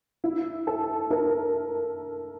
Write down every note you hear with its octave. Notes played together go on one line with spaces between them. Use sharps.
E4
A4
A#4